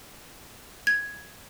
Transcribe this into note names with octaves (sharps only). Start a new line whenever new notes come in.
G#6